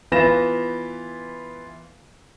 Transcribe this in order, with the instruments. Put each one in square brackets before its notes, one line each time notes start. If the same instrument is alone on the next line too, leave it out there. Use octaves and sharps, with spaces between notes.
[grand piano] E3 B3 F4 B5 A#6 E7